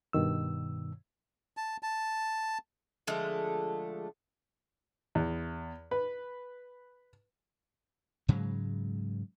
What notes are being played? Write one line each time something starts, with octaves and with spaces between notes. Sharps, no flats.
G2 B2 D#3 E6
A5
A5
D3 F3 G#3 A3
E2
B4
G#2 C#3 F#3 G#3